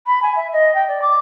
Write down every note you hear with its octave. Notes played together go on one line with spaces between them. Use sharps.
B5
G#5
E5
D#5
G5
D5
D6